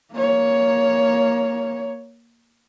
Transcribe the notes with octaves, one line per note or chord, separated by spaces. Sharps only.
A#3 C#5